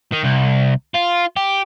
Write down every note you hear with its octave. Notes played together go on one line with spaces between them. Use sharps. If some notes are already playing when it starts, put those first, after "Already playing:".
D#3
C2
F4
G4